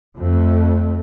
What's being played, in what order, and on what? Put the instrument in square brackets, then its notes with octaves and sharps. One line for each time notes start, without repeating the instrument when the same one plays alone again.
[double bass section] F2 A3